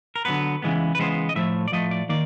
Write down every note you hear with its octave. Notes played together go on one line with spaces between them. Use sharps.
A#4
D3 F#3 B3 B4
C#3 E3 G#3 B3
B4
C#3 E3 G#3 B3 C5
D#5
A2 F3 A3 E5
D5
A2 F3 A3 D#5
D5
D#3 A#3 D5